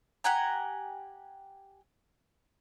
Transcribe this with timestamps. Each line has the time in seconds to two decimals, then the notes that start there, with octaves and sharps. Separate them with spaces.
0.24 G4 F#5 G#5 A#5